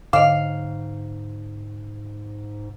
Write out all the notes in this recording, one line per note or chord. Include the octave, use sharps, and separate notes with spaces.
G#2 D3 D#5 F5